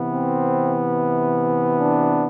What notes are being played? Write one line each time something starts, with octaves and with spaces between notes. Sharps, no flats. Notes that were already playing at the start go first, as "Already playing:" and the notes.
Already playing: C3 E3 B3
C4
D4